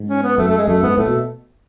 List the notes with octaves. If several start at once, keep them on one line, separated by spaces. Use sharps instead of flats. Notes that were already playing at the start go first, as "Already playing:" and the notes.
Already playing: G#2
C#4
B3
F#2 A3
A3
G#3
F#2 A3
G#2 B3
A2 A3
B2